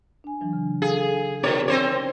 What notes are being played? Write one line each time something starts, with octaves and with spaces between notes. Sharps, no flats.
D4 G#5
E3 F#3 D4
C#3
G#4 A4 F5
B2 D#4 A#4 C#5 D5
C4 C5 C#5